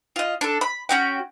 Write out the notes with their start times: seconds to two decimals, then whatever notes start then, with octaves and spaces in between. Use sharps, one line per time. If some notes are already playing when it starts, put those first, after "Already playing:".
0.16 F4 D#5
0.41 D4 A4
0.61 B5
0.89 C#4 F#4 G5